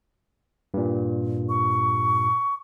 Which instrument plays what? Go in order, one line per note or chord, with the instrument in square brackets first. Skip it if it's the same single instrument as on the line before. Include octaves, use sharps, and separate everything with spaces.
[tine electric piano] G2 A#2
[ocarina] C#6